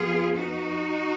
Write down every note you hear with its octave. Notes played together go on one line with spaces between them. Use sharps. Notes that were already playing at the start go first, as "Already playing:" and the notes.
Already playing: F2 F3 B3 F4 G#4
D#4 F#4